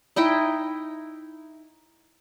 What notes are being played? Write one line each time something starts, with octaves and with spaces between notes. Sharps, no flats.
D#4 E4 D#5 G5